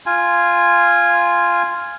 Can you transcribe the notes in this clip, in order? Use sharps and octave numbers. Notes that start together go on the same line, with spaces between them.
F4 G#5